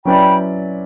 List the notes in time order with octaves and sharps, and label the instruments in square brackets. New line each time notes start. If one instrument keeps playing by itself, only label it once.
[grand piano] F#3 C#4 E4 B4 D5 [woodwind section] G5 B5